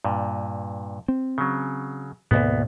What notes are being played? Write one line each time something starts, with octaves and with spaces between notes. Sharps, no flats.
G2 A#2
C4
C#3 F#3
D2 G#2 B2 A#3 B3